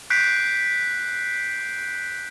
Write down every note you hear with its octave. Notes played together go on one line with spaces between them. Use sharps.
F#6 G6 B6 C7 D7